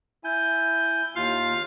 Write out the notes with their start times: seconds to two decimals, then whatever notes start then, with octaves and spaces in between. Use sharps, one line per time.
0.24 E4 G#5 G6
1.16 D#2 F4 F5 F6